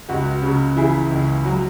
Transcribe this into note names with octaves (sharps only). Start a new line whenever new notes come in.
C#2 F#4
C#3
E3 E4 G#4
C#2
F#3 F#4